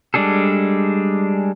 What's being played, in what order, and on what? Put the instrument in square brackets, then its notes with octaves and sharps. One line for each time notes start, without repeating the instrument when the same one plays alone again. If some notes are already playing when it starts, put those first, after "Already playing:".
[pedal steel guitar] G3 G#3 D4 G#4 A4